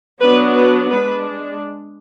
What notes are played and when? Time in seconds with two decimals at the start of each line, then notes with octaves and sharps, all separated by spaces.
0.20 F#3 B3 D4 B4
0.55 B4
0.89 G#3 D4 B4